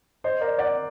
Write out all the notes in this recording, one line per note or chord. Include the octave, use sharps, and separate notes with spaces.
C5 D#5
A#4 D5
D5 F#5